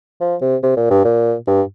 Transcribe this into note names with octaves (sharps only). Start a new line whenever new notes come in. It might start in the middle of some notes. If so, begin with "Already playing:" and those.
F3
C3
C3
A#2
G2
A#2
G2